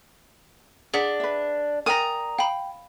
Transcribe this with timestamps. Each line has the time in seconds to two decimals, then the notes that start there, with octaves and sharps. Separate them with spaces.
0.94 D4 G#4 F#5 B6
1.20 B4 E5
1.86 A#4 D5 G5 G#5 A#5 D#6
2.39 F5 G5 B5